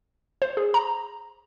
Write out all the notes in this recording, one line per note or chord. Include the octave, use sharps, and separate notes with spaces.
C5
G#4
A#5